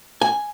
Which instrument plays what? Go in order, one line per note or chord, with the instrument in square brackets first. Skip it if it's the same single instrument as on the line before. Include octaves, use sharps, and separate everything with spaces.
[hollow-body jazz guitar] G#5